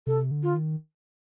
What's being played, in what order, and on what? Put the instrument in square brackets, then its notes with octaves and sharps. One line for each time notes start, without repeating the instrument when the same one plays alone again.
[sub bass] C3 [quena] A4
[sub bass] D3
[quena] F4
[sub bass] D#3